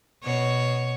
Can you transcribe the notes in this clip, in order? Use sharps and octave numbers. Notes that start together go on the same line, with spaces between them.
B2 C#5